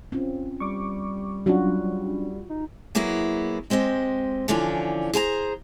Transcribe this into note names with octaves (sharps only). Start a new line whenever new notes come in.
C4 C#4 F4
G3 C#6 D6
F#3 C#4 D4 F4 F#4
D#4
F#3 A#3 B3 E4 G#4
G#3 C4 G4 D#5
D3 E3 F3 C#4 D4 F4
G#4 C5 G#5 A#5